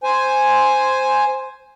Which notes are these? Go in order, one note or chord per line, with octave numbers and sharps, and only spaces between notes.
C5 G#5